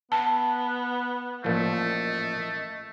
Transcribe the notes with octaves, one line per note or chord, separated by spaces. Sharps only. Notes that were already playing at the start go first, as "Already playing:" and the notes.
B3 A5
A1 A#2 F3 A3 D#5